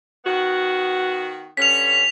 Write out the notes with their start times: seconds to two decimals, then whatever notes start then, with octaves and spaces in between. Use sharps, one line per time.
0.25 D#3 B3 F#4
1.57 G2 D3 C#4 B6 F7